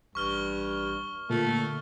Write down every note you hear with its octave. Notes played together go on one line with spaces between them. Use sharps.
A1 G2 C#6 F6 G7
A#2 D3 A3